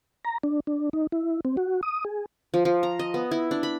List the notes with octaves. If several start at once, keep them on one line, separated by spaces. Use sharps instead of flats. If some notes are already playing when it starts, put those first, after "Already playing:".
A#5
D4
D4
D#4
E4
C4
F#4
D#6
G#4
F3
F3
A#5
D#5
B3
E4
D4
B5